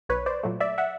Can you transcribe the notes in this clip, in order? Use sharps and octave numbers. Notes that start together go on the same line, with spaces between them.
B1 B4 C#5
C5 D5
A#2 F#3 A3
D5 E5
E5 F#5